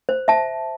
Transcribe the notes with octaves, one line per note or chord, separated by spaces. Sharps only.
C5
E5 A5